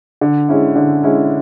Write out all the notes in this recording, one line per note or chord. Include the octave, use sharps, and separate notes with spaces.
D3
G#3 C#4 E4
D3
G#3 C#4 E4